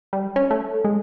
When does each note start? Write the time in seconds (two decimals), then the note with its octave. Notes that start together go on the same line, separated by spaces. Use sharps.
0.13 G3
0.36 C#4
0.51 A3
0.85 G#3